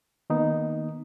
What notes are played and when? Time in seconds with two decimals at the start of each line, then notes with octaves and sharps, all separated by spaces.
0.30 D#3 A#3 B3 D#4